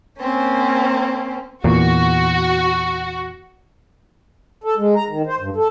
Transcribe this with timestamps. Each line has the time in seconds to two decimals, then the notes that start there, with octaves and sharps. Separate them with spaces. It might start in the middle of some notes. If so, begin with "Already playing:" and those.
0.19 A#3 C4 C#4
1.64 E2 A#2 F#4
4.64 A4
4.78 G#3
4.96 A#5
5.09 D#3
5.26 C5
5.40 G2
5.56 A4